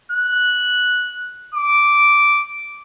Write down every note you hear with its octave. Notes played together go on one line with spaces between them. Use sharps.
F#6
D6